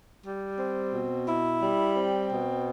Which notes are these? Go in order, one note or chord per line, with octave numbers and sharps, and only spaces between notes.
G3
C4
B2
E4
G3
C4
B2